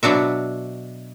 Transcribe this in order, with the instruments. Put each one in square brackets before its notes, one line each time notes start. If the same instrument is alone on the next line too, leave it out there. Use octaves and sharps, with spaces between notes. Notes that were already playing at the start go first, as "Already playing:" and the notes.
[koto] B2 F#3 D4 F#4 E5